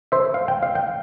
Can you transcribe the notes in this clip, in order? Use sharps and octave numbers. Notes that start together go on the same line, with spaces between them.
C5 E5
F5
G5
F5
G5